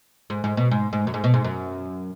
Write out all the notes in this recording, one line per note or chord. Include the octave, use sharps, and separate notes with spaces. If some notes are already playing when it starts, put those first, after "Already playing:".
G#2
G#2
B2
G#2
G#2
F#2
G#2
B2
G#2
F#2